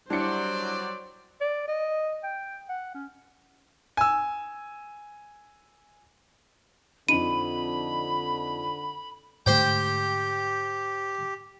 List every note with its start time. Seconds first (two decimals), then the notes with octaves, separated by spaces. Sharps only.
0.10 F#3 G3 D4 E4 C5 D5 C#7
1.41 D5
1.68 D#5
2.23 G5
2.69 F#5
2.94 C#4
3.97 G#5 E6
7.09 F2 D3 D4 D#4 B5 D#7
9.46 G#2 D3 A3 G4 C5 G5